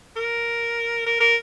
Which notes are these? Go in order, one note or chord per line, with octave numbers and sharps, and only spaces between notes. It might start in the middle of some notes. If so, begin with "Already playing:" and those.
A#4
A#4
A#4